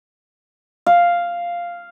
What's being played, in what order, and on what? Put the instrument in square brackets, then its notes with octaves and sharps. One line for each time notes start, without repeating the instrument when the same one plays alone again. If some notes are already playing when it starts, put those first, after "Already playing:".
[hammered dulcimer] F5